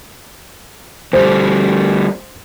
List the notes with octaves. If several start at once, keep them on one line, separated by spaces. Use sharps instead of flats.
D2 G3 C5